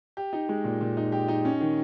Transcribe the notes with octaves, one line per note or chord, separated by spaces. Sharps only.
G4
D#4
G#3
A#2
A#2
D#4
G4
D#4
C#4
D#3